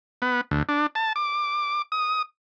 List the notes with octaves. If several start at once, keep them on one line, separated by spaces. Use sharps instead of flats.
B3
D2
D4
A5
D6
D#6